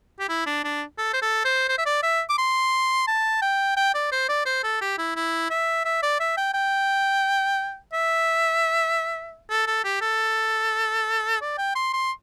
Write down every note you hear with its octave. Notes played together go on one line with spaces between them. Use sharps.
G4
E4
D4
D4
A4
C5
A4
C5
C5
E5
D5
E5
D6
C6
A5
G5
G5
D5
C5
D5
C5
A4
G4
E4
E4
E5
E5
D5
E5
G5
G5
E5
A4
A4
G4
A4
D5
G5
C6
C6